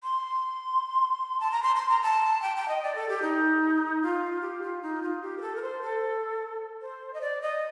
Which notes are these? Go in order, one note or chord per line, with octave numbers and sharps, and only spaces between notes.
C6
A5
A#5
C6
C6
A#5
A5
G5
G5
D#5
D5
A4
G4
D#4
F4
G4
F4
D#4
F4
G4
A#4
A4
A#4
C5
A4
C5
D#5
D5
D#5